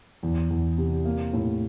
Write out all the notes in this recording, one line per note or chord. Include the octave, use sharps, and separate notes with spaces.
E2
E2
C3
A#3
A2